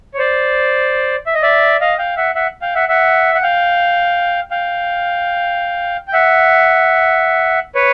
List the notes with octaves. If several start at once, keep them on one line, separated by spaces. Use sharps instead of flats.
C#5
C5 D5
E5
D#5
D5 E5
D#5 F5
F5 G5
E5 F#5
E5 F#5
F5 G5
E5 F#5
E5 F#5
F#5
F5 G5
F5 G5
G5
E5 F#5
B4 C#5